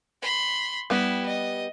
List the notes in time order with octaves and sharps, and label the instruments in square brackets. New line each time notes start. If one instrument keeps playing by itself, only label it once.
[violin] B5 C6
[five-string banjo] G3 B3 [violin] E4
[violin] D#5